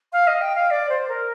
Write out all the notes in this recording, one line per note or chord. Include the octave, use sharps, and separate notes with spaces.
F5
D#5
G5
F5
D5
C5
A#4